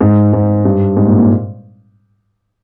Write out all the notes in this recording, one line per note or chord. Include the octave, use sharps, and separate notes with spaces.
G#2
G#2
G2
G#2
A#2
A#2